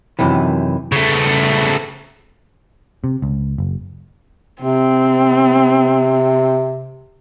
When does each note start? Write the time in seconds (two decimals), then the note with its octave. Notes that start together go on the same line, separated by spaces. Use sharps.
0.19 F#2 C3 D#3 E3
0.92 C#3 A3
3.04 C3
3.22 C#2
3.58 F#1
4.62 C3 C4